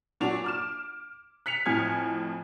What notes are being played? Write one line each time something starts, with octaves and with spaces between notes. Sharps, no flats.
A#2 F#3 D4 F#4 F7
D6 F6 E7
F#6 B6 C#7 F7
F2 A2 G#5 F6 G#6